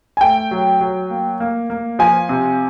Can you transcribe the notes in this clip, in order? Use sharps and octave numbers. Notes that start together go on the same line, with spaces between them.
G#5
A3 G5
F#3
F#3
A#3
A#3
A#3
F3 G#5
C3